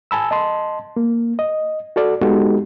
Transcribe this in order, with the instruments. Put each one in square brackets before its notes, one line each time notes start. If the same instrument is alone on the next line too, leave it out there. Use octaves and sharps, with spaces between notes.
[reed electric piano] G#5 A5 B5 E6
D#5 A5 C6
A#3
D#5
F#4 A4 D5
G#3 B3 D#4 F#4 G4 A4